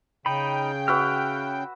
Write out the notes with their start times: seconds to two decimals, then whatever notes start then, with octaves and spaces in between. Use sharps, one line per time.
0.26 C#3 D#4 G5 B5
0.88 F#4 B4 E5 F6 F#6